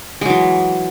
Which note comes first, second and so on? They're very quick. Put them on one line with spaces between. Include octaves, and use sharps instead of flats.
G#3 F#3 E3